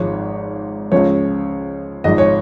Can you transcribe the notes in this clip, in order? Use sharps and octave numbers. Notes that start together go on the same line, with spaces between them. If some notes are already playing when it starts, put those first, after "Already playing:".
Already playing: G#1 G#2 F3 C#5
C#2 C#3 F3 C#5
G#1 G#2 F3 D#5
C#5